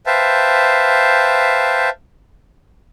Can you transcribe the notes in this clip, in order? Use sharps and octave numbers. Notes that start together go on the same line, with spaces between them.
B4 C5 E5 F5 G5 A5